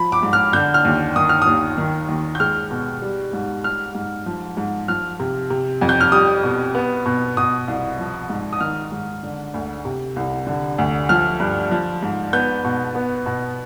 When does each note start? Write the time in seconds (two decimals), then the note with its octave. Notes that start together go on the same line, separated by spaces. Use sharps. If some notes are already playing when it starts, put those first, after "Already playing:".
Already playing: F3 B5
0.12 D6
0.23 G#2
0.33 F6
0.53 D3 G6
0.74 F6
0.85 D#2
1.16 D#3 D#6
1.29 F6
1.42 D#6
1.47 D#2
1.78 D#3
2.09 D#2
2.35 G6
2.40 G#3 F6
2.71 B2
3.02 G3
3.33 G#2
3.64 G3 F6
3.95 G#2
4.26 F3
4.57 G#2
4.88 F3 F6
5.20 C3
5.50 C3
5.81 F2
5.89 G6
6.01 F6
6.12 G3 D#6
6.43 B2
6.75 B3
7.06 B2
7.37 B2 D#6
7.68 C2
7.99 F3
8.30 G#2
8.53 D#6
8.60 D#3 F6
8.92 G#2
9.23 D3
9.54 D2
9.85 C3
10.16 C2
10.47 D3
10.78 D2
11.09 F3 F6
11.40 G2
11.71 F3
12.02 G#2
12.33 B3 G6
12.65 B2
12.95 B3
13.26 B2